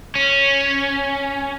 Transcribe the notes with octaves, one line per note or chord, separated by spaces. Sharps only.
C#4